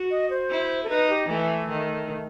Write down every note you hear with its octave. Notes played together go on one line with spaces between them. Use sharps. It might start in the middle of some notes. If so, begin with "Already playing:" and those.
Already playing: F#4
D#5
C5
E4
A4
D#4 B4
G4
E3 A3
D#3